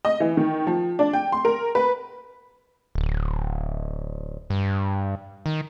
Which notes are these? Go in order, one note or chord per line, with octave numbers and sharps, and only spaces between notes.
D#5
E3
D#3
F3
D4
G5
C6
A#4
B4
D1
G2
D#3